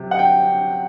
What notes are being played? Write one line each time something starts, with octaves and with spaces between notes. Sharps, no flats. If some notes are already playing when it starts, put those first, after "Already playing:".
Already playing: C3 F#3
F#5
G5